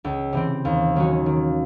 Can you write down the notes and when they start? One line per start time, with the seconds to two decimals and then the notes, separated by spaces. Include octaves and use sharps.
0.05 C#2
0.33 C3 E3 C4
0.65 D#2
0.96 D#3 F#3 C#4 F#4
1.26 D#3